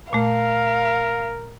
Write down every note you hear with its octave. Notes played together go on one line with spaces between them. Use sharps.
A#2 A3 A#4 F5